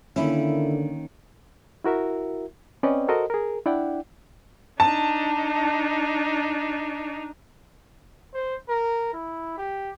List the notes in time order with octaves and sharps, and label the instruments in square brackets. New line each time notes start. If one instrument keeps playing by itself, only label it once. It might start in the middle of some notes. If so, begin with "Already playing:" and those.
[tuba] D3 [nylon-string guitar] D#3 A#3 C#4 [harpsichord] E4
[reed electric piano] E4 F#4 A#4 E5
C4 C#4 B4 D5 D#5 G5
F#4 A4 A#4 C5 D#5
G#4 A#4
D4 E4 D5 F#5 G5
[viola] D4 D#4 [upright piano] A5
[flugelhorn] C5
A#4
E4
G4